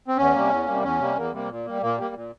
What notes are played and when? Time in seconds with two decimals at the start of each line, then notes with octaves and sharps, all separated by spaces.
0.08 C4
0.17 E2 C#4
0.34 C3 G3 A#3
0.50 E2
0.66 C3 G3 A#3
0.83 E2 C#4
1.00 C3 G3 A#3
1.16 E2 A#3
1.33 C3 G3 A#3
1.50 A#2
1.65 G3 A#3
1.82 A#2 A#3
1.98 G3 A#3
2.15 A#2